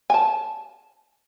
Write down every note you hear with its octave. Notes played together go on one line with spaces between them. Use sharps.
G#5 A5